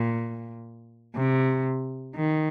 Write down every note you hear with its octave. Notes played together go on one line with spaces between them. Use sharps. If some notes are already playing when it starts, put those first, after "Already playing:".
Already playing: A#2
C3
D#3